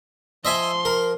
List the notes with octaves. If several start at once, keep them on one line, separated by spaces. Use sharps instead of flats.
F3 D#5 E5 G#5 C6
A#4